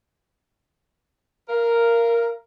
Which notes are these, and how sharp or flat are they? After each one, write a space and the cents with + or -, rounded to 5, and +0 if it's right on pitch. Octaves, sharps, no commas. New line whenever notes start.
A#4 +0 F5 -30